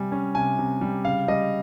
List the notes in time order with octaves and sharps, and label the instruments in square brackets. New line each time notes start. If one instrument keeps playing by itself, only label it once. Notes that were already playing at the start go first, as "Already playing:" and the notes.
Already playing: [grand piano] C3 G3 G#5
C#4
C3 G#5
C3
G3
C#3 F5
G3 D#5